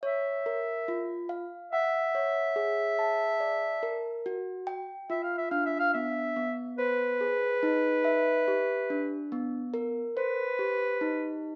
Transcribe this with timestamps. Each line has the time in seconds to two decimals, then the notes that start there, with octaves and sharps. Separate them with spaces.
0.03 C#5 E5
0.46 A#4
0.88 F4
1.29 F5
1.72 E5 F#5
2.15 C#5
2.56 G#4
2.99 A5
3.40 D5
3.83 A#4
4.26 F#4
4.67 G5
5.10 F4 E5
5.23 F5
5.38 E5
5.51 D4 F5
5.65 E5
5.80 F5
5.94 B3 E5
6.36 B3
6.78 B4 C5
7.21 G#4
7.63 D#4
8.05 E5
8.48 G4
8.90 D4
9.32 B3
9.74 A#4
10.16 B4 C5
10.59 G4
11.01 D#4